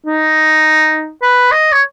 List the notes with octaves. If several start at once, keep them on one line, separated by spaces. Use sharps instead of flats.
D#4
B4
D#5
C#5